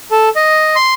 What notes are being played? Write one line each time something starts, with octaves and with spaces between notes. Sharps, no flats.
A4
D#5
C6